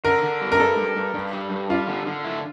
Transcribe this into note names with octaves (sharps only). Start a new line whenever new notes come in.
D3 A#4
D3
G3
A#4
G2 A4
G2
G2
G2
G3
G2
G3 F4
D3
D3
E4